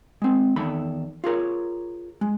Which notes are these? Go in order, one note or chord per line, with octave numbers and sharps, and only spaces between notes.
G#3 C4
E2 D#3 A4 B5
F4 G#4 A#4 C#5
G#3